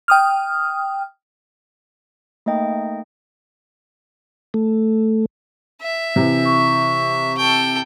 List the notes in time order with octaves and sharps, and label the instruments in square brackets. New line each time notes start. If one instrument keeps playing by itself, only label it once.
[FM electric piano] G5 D#6 F6
[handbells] A3 A#3 D#4 D#5 G5
[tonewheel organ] A3
[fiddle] E5
[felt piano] C3 E3
[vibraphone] C#6
[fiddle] A4 G5